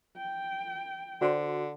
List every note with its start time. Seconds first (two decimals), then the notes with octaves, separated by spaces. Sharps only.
0.17 G5
1.21 D3 F#4 C5 D5 C6